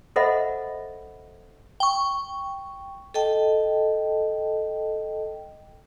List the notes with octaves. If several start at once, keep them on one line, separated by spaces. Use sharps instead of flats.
A4 C5 D#5 E5 F#5 B5
G5 C#6
A4 D#5 G5 A5